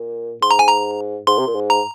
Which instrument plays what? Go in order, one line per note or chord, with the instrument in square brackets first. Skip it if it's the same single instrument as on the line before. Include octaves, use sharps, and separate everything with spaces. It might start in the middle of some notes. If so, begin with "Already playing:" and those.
Already playing: [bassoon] A#2
[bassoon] G#2 [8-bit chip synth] C6
[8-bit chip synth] A#5
G#5
A#5
[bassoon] G#2 [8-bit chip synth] C6
[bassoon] C3
A#2
G#2
[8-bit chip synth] A#5